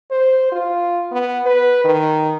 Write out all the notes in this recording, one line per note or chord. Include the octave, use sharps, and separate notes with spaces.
C5
F4
B3
B4
D#3